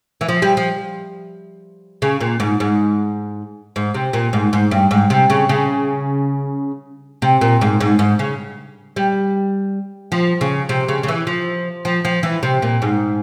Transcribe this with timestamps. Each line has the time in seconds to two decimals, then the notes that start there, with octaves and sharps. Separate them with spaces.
0.21 E3
0.28 F3
0.42 G3
0.57 F3
2.02 C#3
2.21 A#2
2.40 G#2
2.60 G#2
3.76 G#2
3.94 C3
4.13 A#2
4.33 G#2
4.53 G#2
4.71 G2
4.91 G#2
5.10 C3
5.30 C#3
5.49 C#3
7.22 C3
7.41 A#2
7.61 G#2
7.80 G#2
7.99 G#2
8.19 C#3
8.96 G3
10.12 F3
10.41 C#3
10.69 C3
10.88 C#3
11.03 C#3
11.08 E3
11.27 F3
11.85 F3
12.05 F3
12.23 E3
12.43 C3
12.62 A#2
12.82 G#2